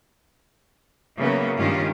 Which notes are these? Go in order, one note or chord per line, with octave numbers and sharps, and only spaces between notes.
C#3 E3 F#3 A#3 B3
G2 D#3 G#3 C#4 F4 G4